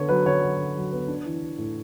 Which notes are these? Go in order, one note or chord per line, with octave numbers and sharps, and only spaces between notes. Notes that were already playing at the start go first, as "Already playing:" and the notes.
Already playing: D3 B3 C#5
F#3 B4
D3 C#5
F#3
D3
F#3
B3
D4
E3
E3
A2